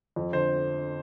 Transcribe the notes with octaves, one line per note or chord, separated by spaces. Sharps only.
F2
D3 C5